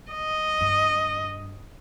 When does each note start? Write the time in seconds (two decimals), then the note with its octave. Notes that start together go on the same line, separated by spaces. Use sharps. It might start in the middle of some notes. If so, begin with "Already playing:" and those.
0.11 D#5
0.61 G2